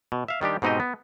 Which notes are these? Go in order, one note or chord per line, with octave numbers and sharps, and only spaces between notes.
B2
E5 F5
D#3 G3 D4 G4
G#2 B2 C4 D#4 G4 D#5
B3